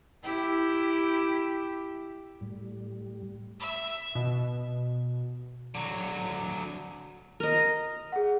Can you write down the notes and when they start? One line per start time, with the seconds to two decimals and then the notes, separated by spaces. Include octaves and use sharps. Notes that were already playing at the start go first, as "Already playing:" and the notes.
0.23 E4 G4
2.41 A2 G3
3.60 E5
4.15 B2
5.75 D3 F#3
7.40 A#4 D#5
8.12 G#4 F#5